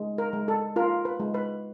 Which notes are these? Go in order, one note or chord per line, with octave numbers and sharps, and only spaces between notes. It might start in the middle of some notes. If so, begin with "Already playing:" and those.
Already playing: G#3
A#4
G#3
A4
F4 A#4
B4
G#3
B4